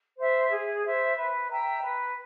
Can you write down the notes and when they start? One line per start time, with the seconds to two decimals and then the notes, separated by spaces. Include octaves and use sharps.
0.18 C5 E5
0.51 G#4
0.83 C5 E5
1.16 B4
1.49 E5 G5 A#5
1.81 B4